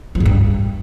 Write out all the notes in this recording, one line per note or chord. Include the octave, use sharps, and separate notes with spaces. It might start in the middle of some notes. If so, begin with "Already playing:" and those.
F3
G#2
G2